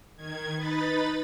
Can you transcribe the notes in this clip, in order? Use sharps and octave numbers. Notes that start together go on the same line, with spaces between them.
D#3 G#6
D#4 B4 B5 A6